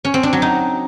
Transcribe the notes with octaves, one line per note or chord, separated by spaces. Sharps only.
C#4
C4
D4
F#3
D#4